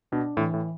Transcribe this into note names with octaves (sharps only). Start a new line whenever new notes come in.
B2 D4
A2 E3
A2